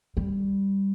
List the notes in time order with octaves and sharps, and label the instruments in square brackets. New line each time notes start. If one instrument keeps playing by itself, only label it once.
[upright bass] G3